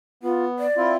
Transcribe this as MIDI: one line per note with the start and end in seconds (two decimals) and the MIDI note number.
0.23 0.66 59
0.23 0.45 65
0.59 0.94 74
0.77 0.97 60
0.77 0.97 64
0.77 0.97 65